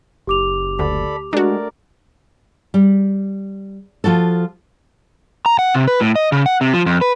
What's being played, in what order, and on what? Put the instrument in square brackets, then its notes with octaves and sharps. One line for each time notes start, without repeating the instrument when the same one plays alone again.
[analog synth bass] F#1 [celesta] G4 D6 F7
[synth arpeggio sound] D2 [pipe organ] A4 D5 B5
[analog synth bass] G#3 [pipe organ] A3 A#4 D5 [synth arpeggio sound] D4 F#4
[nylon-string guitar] G3
F3 F4 F#4 A4
[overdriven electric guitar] A#5
F#5
C3
B4
A2
D#5
C#3
F#5
C3
F3
F2
B4